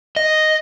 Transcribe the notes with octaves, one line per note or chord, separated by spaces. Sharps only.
D#5